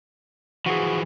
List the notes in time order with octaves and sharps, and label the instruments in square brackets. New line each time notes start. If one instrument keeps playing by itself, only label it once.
[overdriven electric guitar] E3 F3 [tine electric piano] F#4 G#4